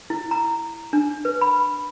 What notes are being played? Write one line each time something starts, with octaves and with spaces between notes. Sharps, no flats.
E4
A#5
D4
B4
B5